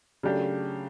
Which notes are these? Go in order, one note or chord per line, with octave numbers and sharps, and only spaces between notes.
C#3 F#3 A3 D4 G4